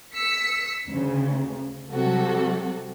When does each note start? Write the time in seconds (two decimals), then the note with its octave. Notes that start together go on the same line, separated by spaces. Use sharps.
0.14 E6 B6 C#7
0.90 D2 C#3
1.91 C3 F#3 G3 F#4 A4